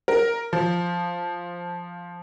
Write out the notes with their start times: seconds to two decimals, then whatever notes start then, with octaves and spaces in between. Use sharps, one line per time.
0.08 A#4
0.53 F3